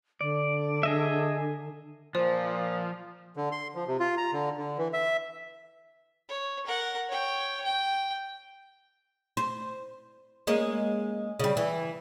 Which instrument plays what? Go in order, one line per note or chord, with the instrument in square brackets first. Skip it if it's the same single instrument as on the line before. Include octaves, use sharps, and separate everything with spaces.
[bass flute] D3 [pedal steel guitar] D5
[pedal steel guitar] G#4 D#5 E5
[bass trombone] A#2 [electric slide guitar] F3 [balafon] C5
[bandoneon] D3
C6
F3
C3
F4
A#5
D3
D3
E3
E5
[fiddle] C#5
A#4 F#5
C#5 G5
G5
[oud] C5
G#3 A#3 C#4
C#3 G3
E3